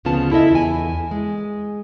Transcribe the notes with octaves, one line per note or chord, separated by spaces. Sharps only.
D2 C#3 F3 B3 F4 A5
E4 A4 D#5 E5
E2 G#5
G#3